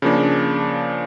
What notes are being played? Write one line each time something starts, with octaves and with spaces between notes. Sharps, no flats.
C#3 F3 A#3 D4